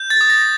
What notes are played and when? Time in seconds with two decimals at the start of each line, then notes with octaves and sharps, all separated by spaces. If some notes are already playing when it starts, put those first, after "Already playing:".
Already playing: G6
0.10 A6
0.21 D#6
0.30 A#6